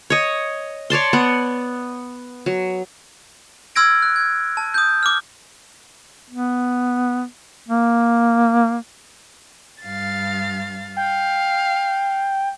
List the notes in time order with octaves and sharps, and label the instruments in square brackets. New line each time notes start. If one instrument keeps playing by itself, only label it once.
[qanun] C#5 D#5
C#5 D5 A5 C6
B3 F#5
F#3
[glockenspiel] C6 E6 F6 G#6 A#6 D7
F#6
G#6
A5
D#6 G6
D6 F6
[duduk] B3
A#3
[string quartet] G2 F5 A6
[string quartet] F5 [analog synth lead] G5